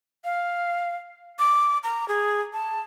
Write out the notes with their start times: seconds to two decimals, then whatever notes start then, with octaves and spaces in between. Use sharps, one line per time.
0.24 F5
1.39 D6
1.83 A#5
2.08 G#4
2.53 A5